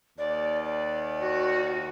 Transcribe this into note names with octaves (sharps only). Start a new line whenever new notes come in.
D#2 D5
D5
F#4